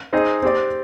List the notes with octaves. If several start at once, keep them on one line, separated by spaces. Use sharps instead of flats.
C4 D#4 G#4 D#5
C4 G4 D5